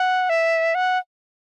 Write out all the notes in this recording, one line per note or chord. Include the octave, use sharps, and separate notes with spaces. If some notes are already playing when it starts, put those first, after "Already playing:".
Already playing: F#5
E5
F#5